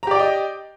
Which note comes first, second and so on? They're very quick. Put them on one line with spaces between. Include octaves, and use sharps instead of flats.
A#5 G4 D5 G5 D#5